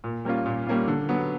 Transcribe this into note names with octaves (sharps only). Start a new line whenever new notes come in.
A#2
G3 A#3 C#4 F4
A#2
G3 A#3 C#4 F4
D3
F#3 B3